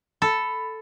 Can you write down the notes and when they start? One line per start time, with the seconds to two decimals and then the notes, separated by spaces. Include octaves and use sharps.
0.22 A4 B5